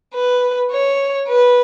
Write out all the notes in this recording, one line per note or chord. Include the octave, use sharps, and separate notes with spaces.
B4
C#5
B4